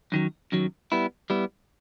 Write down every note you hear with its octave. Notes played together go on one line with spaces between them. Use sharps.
F#2 D#3 F#3
F#2 D#3 F#3
G3 B3 E4
G3 B3 E4